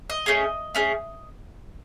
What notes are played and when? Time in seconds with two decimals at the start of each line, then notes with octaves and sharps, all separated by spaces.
0.10 D#5
0.26 A3 C#4 G#4
0.75 A3 C#4 G#4